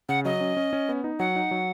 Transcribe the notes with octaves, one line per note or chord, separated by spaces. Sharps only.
C#3 F#5
F#3 D#5
C#4
C#4
C#4
B3
D#4
F#3 F#5
D#4
F#3